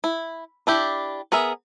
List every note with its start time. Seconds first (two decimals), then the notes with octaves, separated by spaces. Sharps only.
0.04 E4
0.67 D4 E4 G4
1.32 B3 G#4 A#4 E5